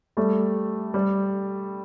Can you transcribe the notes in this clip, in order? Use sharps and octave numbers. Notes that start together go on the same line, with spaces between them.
G3 A3
G3